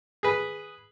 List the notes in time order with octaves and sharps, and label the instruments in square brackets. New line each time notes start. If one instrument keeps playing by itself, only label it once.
[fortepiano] G#4 B4